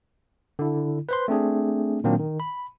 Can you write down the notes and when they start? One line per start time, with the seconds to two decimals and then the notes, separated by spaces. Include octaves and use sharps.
0.59 D3 E4
1.09 B4 C5 C6
1.28 A3 C4 D4 G#4
2.04 A#2 D#3 F#3 A#3 C4 D4
2.19 D#3
2.40 B5